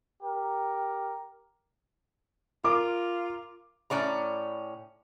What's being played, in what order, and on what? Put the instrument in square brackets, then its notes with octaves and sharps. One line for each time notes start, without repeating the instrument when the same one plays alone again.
[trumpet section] G4 A#4
[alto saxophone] F4 [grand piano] A#4 [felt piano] D6
[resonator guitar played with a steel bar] A2 C#4 D5 A#5